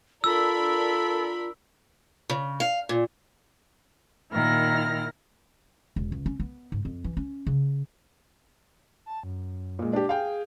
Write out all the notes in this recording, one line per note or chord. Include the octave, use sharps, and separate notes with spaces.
D4 F4 A4 A#4 B5 E6
C#3
F5
A#2
A#2 D#3 E4 F6 A#6
E1
C#2
C#4
B3
G#2
F2
E3
C#4
C#3
A5
F#2
A#2 G#3
D4 G4
G#4 F5 G5